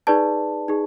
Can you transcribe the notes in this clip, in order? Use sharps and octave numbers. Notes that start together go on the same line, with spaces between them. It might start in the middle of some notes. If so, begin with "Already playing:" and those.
D#4 G#4 B4 D5 A5
D#4 G#4